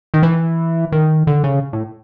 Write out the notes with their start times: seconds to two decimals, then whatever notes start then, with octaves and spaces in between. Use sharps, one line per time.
0.14 D#3
0.23 E3
0.92 D#3
1.27 D3
1.44 C#3
1.73 A2